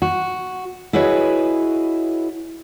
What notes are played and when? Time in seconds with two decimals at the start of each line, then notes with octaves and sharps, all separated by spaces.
0.02 F#4
0.93 E4 F#4 G#4 B4 C#5 D#5